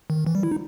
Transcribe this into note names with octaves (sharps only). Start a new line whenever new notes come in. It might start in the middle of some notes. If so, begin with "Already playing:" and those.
D#3
E3
G3
E4
D#4